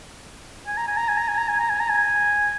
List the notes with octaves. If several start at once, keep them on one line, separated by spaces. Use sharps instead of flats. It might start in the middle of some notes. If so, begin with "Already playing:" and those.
G#5
A#5
G#5
A#5
G#5
A#5
G#5
A#5
G#5
A#5
G#5
A#5
G#5